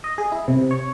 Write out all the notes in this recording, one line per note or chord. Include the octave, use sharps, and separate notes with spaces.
D#5
G#4
E4
C3
C#5